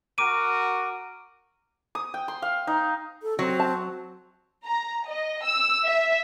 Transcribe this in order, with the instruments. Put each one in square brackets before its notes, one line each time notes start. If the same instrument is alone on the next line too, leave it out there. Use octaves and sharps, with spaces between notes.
[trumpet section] F#4 A#4 [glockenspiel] D6 D7 D#7
[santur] D#6
G5
C6
F5
D#4
[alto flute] A4
[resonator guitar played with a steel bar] F#3 [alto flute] C4
[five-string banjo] A5
[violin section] A#5
D#5
E6
E5